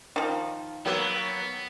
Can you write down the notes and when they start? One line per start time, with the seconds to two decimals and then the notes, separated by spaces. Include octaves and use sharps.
0.16 D#3 F3 F5
0.86 F#3 A#3 B3 B4 G5 E6 A6